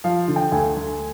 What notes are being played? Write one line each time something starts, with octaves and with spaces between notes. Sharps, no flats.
F3 F5
D3
G5
D2 G#5
D2